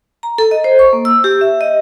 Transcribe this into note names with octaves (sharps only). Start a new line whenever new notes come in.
A#5
A4
D#5
C5
C#6
A#3
E6
G4
E5
D#5